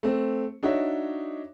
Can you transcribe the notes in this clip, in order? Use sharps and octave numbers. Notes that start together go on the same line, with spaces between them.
A3 C4
D4 D#4 F#4 C#5 E5